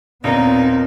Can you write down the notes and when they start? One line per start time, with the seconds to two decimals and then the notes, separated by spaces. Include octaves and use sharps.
0.24 D#1 B3 C4 D#4 F4 A#4 D5